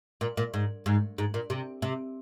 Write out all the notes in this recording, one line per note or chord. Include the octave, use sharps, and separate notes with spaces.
A#2
A#2
G#2
G#2
G#2
A#2
C3
C3